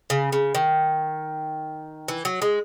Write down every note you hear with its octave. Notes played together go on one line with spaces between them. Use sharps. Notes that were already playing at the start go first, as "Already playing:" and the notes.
C#3
C#3
D#3
E3
F#3
G#3